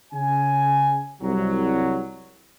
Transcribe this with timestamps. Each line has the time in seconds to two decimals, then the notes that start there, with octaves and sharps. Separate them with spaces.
0.13 C#3 G#5
1.22 C2 F#3